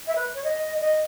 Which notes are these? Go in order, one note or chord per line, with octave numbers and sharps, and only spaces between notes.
E5
B4
C#5
D#5
D#5